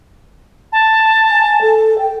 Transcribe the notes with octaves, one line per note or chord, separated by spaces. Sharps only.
A5
G#5
A4
G5